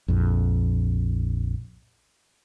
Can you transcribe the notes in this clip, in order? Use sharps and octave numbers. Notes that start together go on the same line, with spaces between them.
A#1 F2